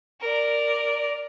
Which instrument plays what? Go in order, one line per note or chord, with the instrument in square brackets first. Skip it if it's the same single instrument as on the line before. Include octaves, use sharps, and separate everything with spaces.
[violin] A#4 D5